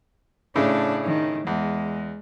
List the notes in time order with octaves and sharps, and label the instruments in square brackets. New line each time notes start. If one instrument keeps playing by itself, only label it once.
[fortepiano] A2 C#3 [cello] D4
[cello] D#3
[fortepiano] E2 [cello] G#3